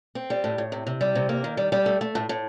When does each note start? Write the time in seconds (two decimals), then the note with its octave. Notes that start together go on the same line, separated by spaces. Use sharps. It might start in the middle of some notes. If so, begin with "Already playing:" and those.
0.15 C4
0.30 G3
0.44 A2
0.58 A2
0.72 C3
0.87 C3
1.01 G3
1.15 C3
1.29 A#3
1.44 D#3
1.57 G3
1.72 G3
1.86 A3
2.01 A3
2.15 A2
2.29 A2